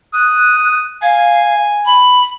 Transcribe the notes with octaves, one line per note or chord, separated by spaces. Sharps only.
D#6 F#6
F5 G#5
B5